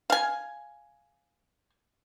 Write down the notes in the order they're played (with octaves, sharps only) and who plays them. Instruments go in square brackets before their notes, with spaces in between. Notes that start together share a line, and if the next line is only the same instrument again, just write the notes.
[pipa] F5 G#5